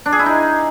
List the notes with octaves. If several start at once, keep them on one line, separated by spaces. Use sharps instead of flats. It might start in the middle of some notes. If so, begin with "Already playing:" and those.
D4
G#4
E4
D#4